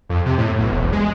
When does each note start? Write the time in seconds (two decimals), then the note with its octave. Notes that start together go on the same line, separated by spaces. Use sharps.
0.09 F2
0.26 C3
0.38 A2
0.59 B1
0.71 E1
0.93 G#3